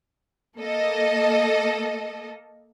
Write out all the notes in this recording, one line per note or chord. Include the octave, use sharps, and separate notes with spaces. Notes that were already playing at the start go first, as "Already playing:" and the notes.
A#3 A4 D#5